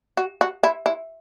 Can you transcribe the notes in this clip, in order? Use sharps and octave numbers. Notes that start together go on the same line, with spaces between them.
F#4
F#4
E4
E4